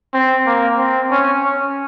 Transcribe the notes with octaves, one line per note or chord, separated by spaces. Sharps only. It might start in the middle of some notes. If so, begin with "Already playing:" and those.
C4
A#3
C4
C#4
C#4